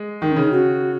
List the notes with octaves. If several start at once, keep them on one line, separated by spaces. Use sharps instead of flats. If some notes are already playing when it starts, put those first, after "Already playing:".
Already playing: G#3
D#3 D#4
C#4
C#3
D#4
F#4